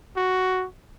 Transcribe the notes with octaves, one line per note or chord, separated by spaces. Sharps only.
F#4